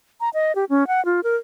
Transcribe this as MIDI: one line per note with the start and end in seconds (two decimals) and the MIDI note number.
0.21 0.29 82
0.34 0.55 75
0.55 0.65 67
0.70 0.87 61
0.87 1.03 78
1.05 1.20 65
1.24 1.36 70